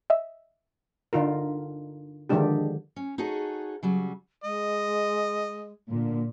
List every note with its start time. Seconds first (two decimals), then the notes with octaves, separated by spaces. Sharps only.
0.10 D#5 E5
1.13 D3 D#4 F4 A#4
2.29 D3 D#3 F3 G#3 D4 G4
2.96 C#4
3.18 D#4 F#4 G#4 A4 C#5
3.83 C#3 F#3 G3
4.44 G#3 D#5
5.89 A#2 D3